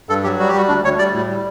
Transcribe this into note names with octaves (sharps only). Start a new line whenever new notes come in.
G2 A4
F#3 G4
G3 F#4
G4
G3 F#4
D2 D4
D2 C#5
G3 D5
A2
G3